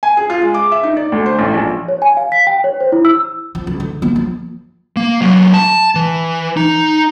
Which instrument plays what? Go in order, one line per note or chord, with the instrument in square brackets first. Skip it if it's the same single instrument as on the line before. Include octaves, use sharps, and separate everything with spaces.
[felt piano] G#5
G#4
F4
G#3
D6
E5
D#4
D5
D2
C5
A1
A#1
[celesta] C#5
G#5
F5
B6
G5
C#5
C5
E4
E6
[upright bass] F3
C#2
D3
A#3
F3
[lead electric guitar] A#3
E2 F#3
A5
E3
D#4